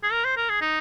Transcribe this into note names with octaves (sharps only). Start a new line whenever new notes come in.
G#4
A#4
C5
A#4
G#4
D#4